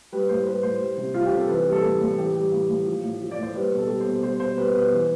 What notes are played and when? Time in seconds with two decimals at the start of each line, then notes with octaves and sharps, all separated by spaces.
0.12 G3 B4
0.29 A2 C5
0.47 G3 B4
0.63 A2 C5
0.81 G3
0.97 C3
1.14 G3 F4
1.26 G4
1.32 C3
1.37 A4
1.49 E3 B4
1.67 G3
1.72 A4
1.84 A2
2.01 A2
2.18 E3 G4
2.36 G3
2.52 A2
2.70 A2
2.86 F3
3.03 A2
3.21 F3
3.31 D5
3.38 A2 C5
3.55 G3 B4
3.73 B2
3.78 A4
3.89 G3
4.01 C5
4.06 B2
4.23 G3 C5
4.40 B2 C5
4.58 G3 B4
4.74 B2 B4
4.92 E3